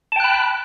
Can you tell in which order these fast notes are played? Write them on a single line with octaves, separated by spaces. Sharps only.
A5 G5 F#6 B5